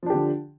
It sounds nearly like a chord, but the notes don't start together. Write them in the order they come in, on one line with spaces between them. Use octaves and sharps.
F3 D4 G4 D3